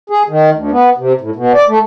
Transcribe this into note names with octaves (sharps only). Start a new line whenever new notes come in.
G#4
D#3
D2
B3
C3
A2
B2
D5
A3